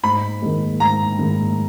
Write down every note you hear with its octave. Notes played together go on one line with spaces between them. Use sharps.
G#2 B5
D#3 G#3
G#2 A#5
D#3 G#3